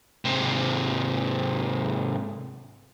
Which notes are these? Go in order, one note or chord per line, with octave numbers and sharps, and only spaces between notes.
G#2 C3